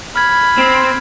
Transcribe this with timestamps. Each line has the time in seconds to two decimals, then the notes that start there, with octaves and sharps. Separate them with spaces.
0.16 B5 F6 G#6
0.58 C4